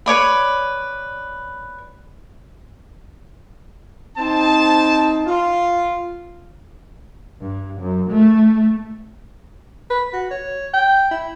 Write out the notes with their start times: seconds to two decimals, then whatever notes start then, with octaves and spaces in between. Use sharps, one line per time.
0.06 B4 C#5 D5 B5
4.17 C4 D#4 C5 A5
5.27 F4
7.41 G2
7.80 F#2
8.11 A3
9.90 B4
10.13 F#4
10.31 C#5
10.74 G5
11.11 E4